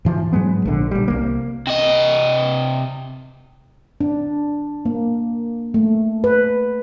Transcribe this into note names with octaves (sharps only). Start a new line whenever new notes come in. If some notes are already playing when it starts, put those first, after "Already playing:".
G#2 E3 F3
G#2 F#3 G#3 B3
A#1 D3
A#1 G3
C2 A#3
C3 D#5
D4
A#3
A3
B4